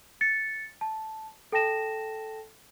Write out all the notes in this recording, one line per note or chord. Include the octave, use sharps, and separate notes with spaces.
A6 C#7
A5
A4 G5 A5 A#6 E7